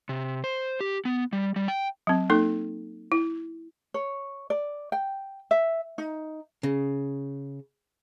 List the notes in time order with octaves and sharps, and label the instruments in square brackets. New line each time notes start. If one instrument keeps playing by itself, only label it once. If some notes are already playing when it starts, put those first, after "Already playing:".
[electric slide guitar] C3
C5
G4
B3
G3
G3
G5
[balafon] F#3 C4
A#3 D#4 A4
E4
[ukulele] C#5
D5
G5
E5
D#4
[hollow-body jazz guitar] C#3